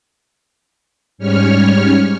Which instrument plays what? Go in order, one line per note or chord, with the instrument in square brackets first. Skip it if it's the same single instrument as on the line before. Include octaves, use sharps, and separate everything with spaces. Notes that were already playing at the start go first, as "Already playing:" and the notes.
[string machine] G#2 G3 C#4 C#5 F6